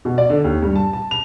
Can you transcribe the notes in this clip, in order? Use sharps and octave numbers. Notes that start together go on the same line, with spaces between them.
B2
D5
D3
D#2
G2
A5
A5
F7